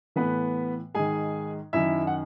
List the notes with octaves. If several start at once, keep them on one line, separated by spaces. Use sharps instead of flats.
A2 E3 B3 B4
G#2 D#3 G#4 G#5
F#2 D#3 E4 E5
F#5